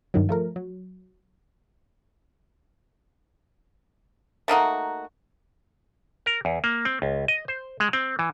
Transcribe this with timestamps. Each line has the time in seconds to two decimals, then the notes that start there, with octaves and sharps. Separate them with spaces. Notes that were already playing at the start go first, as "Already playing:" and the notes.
0.14 G2 D#3 F#3
0.29 F3 A3 A#4
0.56 F#3
4.48 A3 A#3 D#4 F#4
6.26 A#4
6.45 E2
6.64 A#3
6.85 C4
7.02 C#2
7.28 D#5
7.48 C5
7.80 G#3
7.93 C4
8.19 E3